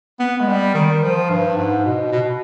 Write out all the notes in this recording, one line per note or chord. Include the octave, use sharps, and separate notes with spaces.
B3
G#3
G3
D#3
F3
G2
G#2
B2
B2